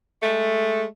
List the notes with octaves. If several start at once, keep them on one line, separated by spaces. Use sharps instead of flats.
G#3 A3